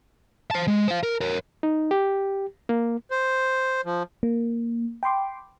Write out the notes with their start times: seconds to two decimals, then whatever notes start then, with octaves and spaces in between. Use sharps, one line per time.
0.51 C5 A5
0.67 G#3
0.88 C5 F5
1.03 A#4
1.21 A#4 C#5
1.63 D#4
1.91 G4
2.69 A#3
3.11 C5
3.85 F3
4.23 A#3
5.03 G5 B5 C6 D6